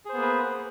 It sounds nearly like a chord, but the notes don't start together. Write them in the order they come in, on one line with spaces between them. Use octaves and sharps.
G#4 C5 B3 A#3 B4